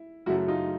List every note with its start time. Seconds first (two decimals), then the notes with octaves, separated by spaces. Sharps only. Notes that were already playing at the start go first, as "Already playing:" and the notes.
Already playing: E4
0.26 F#2 C#3 F#3 A3 E4 F#4
0.48 D#4 F4